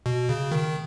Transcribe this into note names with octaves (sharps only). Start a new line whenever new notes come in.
B2
C#3
D#3